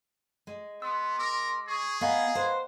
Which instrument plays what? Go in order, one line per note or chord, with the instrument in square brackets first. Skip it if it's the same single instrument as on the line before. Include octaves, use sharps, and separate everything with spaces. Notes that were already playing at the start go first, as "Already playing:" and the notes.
[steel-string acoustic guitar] G#3
[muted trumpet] B3 [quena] C6 [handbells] E6
[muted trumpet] A#4 [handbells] D6 E6 A#6
[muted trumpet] G#4 [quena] C#6
[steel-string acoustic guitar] B3 [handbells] D#5 F5 A#5 [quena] G#5
[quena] B4 [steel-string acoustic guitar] C5